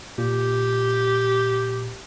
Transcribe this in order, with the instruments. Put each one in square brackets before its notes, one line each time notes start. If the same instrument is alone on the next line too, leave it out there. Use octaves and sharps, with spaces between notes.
[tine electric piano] A#2 [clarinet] G4